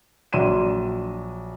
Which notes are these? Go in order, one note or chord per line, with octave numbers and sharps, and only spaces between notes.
A#1 F#3 D4 C6 D#7 E7